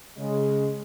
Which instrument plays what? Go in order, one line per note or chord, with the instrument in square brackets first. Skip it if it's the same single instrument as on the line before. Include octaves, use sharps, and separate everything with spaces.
[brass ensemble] C#3 G#3